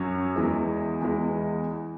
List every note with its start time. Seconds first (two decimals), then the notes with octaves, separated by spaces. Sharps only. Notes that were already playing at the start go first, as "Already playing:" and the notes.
Already playing: F#2 F#3 C#4
0.36 E2 E3 G#3
1.01 E2 E3 G#3